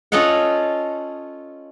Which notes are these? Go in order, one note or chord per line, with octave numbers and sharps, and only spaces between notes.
C#4 F4 A4 D#5 F5 F#5